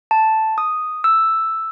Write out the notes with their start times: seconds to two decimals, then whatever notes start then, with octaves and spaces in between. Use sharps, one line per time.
0.11 A5
0.58 D#6
1.04 E6